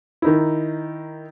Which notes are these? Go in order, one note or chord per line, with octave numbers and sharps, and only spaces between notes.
D#3 D#4 E4